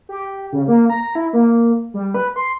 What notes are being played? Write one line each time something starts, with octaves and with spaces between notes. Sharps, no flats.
G4
C#3
A#3
A#5
E4
A#3
G3
B4
C6